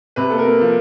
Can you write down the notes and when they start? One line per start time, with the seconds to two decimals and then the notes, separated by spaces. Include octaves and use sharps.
0.16 C3 B4
0.30 A#3 A4
0.38 A#4
0.46 A#3
0.60 F3